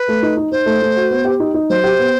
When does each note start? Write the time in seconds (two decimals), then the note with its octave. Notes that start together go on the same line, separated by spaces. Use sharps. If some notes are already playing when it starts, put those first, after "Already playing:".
Already playing: B4
0.08 A3
0.23 D#4
0.37 D#4
0.51 D#4 C5
0.66 A3
0.82 A3
0.96 F#4
1.11 B3
1.25 G4
1.40 D#4
1.54 D#4
1.70 F#3 C5
1.84 G4
1.99 B3